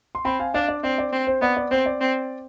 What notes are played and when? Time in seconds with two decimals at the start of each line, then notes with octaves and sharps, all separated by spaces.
0.15 C6
0.25 C4 G5 B5
0.39 F5 G#5
0.54 D4 D5 F5
0.69 D5
0.83 C4 D5
0.98 D5
1.13 C4
1.27 C5
1.41 B3 D5
1.57 D5
1.71 C4 C5
1.86 D5
2.01 C4